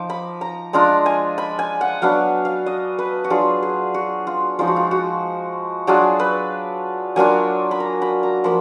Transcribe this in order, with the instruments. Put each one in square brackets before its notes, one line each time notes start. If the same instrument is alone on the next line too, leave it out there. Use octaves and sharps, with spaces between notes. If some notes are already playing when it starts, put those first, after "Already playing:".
Already playing: [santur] F3 D#4 D6
B5
A#5
G#3 D4 F4 A#5
G#5
B5
G#5
F#5
F#3 B3 D4 F5
F5
D#5
B4
F#4
F#3 D4 F4 G#4
G#4
F#4
F4
F3 G#3 D#4 F4
F#4
F4
F#4
F#3 D4 F4 G#4
B4
F#3 A#3 D4 F4 G#5
B5
A#5
B5
A#5
F3 A#3 B5